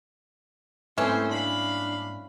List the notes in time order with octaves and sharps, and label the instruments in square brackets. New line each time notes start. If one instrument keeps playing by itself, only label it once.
[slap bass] G#2 G3 A#3 [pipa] E3 C#4 [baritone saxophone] A3 [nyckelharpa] C4 C5
[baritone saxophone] D4 [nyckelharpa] F5 B5